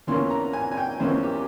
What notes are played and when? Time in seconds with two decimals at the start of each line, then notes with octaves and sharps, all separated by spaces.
0.07 E2 E3 A#3 C#4 C6
0.30 A#5
0.53 G#5
0.71 G#5
0.77 G5
1.00 E2 E3 A#3 C#4 C5
1.23 G4